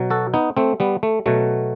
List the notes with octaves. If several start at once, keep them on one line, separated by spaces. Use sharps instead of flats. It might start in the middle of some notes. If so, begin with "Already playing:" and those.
Already playing: B2 F#3
F#4 A4
B3 D#4
A3 C4
G3 B3
A3
B2 F#3 A3